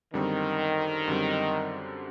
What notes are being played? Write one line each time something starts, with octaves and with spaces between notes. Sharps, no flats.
F#2 D3 D#3 G3 C4
F#2 D3 G3 C4